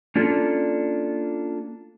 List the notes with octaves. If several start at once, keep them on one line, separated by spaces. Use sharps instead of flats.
A#3 C#4 D4 F4 A4